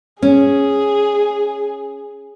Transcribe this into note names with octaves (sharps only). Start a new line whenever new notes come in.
C#4 G#4